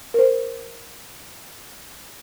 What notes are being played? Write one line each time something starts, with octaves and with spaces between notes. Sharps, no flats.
A#4 C5